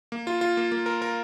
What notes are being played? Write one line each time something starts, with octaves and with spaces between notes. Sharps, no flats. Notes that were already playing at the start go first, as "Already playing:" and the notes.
A#3
F4
F4
A#3
A#3
A#4
A#4